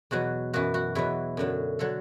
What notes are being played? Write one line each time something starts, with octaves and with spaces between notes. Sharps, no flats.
E2 B2 F#3 F#4
F#2 E3 F#4
F#4
E2 B2 F#3 E4
F#2 D3 F#3
D3 F#3 A4